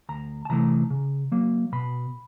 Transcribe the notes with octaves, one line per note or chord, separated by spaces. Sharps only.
D2 A#5
A5
C3 E3 A3 A#5
C#3
F#3 A#3
B2 B5